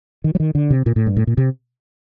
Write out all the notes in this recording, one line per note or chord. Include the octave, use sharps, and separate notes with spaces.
D#3
F#3
D#3
D3
C3
A#2
A2
G2
A2
A#2
C3